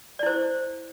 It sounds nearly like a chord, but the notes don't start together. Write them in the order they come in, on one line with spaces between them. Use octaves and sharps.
D5 E4 C5